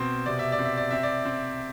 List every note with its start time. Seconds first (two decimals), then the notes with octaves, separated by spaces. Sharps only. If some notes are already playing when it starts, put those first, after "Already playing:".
Already playing: B2 C4 C5
0.26 C3 D5
0.39 E5
0.52 D5
0.59 C4
0.65 E5
0.77 D5
0.91 C4 E5
1.03 D5
1.25 C4